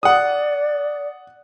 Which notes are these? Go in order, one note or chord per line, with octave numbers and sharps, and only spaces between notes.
D5 F#5 D#6